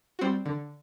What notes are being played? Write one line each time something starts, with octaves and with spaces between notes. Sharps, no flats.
G3 C4 F#4
D3